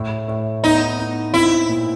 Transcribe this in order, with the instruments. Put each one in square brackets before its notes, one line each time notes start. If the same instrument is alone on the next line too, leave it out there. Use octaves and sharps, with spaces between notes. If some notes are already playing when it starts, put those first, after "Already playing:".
Already playing: [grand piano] A2
A2
[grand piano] B3 [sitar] D#4
[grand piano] B3
[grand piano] C4 [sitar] E4
[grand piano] A#2